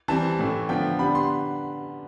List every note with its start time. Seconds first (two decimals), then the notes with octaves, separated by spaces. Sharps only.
0.08 E3 G3 C4 A5
0.39 A2 E3 A3
0.69 D3 F3 B3 G5
0.99 D3 G3 B3 B5
1.15 C6